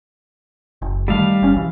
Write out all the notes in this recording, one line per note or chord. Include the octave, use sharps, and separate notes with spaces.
F#1
D#3 G3 A3 F5
F#1 C#4
B1 E3